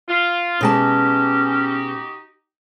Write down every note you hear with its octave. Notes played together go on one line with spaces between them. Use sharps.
F4
B2 G#3 C#4 D#4 F#4 G4 A5